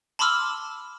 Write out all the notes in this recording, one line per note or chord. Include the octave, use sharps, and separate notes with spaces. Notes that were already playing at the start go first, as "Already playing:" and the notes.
A5 B5 C6 D6 E6 F6